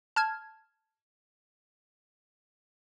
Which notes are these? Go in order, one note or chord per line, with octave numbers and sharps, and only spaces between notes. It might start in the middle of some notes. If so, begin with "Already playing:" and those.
A5 F6 G#6